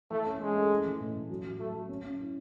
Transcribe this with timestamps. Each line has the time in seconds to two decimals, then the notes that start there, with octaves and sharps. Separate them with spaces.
0.11 E3 A3
0.26 C#4
0.40 G#3 C#4
0.55 A3
0.70 E4
0.86 E3
1.00 A2
1.15 A2
1.30 F#3
1.44 F#3
1.59 F#3 A3
1.75 F#3
1.89 C#4
2.04 C#4
2.19 E4